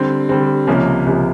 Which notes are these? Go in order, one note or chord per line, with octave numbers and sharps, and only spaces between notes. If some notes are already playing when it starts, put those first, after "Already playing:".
Already playing: D3 G3 C4
D3 G3 C4
C#2 C3 F3 A#3 C#4
C#2 C3 F3 A#3 C#4